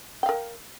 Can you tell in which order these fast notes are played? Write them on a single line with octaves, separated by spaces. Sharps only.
G5 F5 A#4